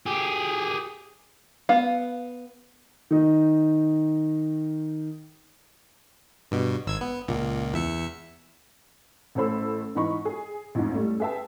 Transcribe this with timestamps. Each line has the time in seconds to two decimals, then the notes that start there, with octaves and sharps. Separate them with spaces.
0.06 G4 G#4
1.69 B3 F5
3.11 D#3 D#4
6.51 G2 B2
6.87 G#1 E6 G#6
7.01 B3
7.28 C#2 A#2
7.74 E2 E5 C#7
9.35 A1 A3 A4 C5 B5 E6
9.95 G#2 E3 D#4 B5 C#6
10.25 G#4
10.75 A1 F2 G#2
10.92 G3 A3 C#4
11.20 G#4 B4 E5 G5 A5